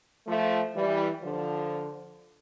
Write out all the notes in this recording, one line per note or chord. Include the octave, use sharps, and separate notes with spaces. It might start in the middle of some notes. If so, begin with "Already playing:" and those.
F3 A3
E3 G3
D3 F3